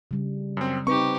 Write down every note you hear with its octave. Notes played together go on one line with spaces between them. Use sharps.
C#3 G3
F#2 C4
C4 D#4 G4 B4 C#6